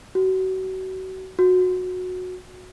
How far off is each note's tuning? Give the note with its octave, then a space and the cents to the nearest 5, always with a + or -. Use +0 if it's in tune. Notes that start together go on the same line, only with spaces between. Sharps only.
F#4 +30
F#4 -15